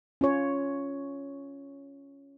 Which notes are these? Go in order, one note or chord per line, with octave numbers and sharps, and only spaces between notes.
C#4 F4 C#5